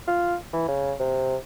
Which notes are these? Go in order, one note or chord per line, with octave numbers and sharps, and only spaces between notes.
F4
E3
C#3
C3